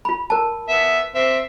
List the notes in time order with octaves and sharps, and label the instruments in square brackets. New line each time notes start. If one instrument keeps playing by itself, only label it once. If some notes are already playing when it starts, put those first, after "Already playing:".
[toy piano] F4 B5
A#4 A5
[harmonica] B3 E5
C4 E5